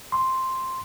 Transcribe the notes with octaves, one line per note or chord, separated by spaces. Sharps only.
C6